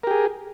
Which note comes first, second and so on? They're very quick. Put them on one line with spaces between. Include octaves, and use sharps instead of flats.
A#4 G4 G#4